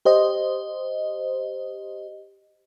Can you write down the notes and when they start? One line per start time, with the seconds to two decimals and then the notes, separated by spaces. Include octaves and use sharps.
0.05 G4 C5 D#5